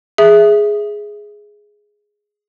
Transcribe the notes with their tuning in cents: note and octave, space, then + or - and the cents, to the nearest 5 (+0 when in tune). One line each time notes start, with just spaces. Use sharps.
G#4 +0 E5 +0